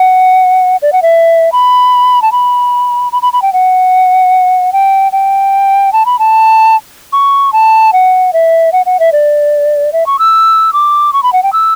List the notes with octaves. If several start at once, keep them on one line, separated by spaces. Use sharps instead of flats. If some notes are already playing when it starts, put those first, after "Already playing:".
Already playing: F#5
D5
F#5
E5
B5
A5
B5
B5
B5
B5
G5
F#5
G5
G5
A5
B5
A5
C#6
A5
F#5
E5
F#5
F#5
E5
D5
E5
C#6
E6
D6
C#6
B5
F#5
G5
E6